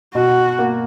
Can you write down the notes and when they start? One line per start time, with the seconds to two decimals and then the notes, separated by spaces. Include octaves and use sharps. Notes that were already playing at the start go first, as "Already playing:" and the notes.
0.14 B2 F#4
0.59 A#3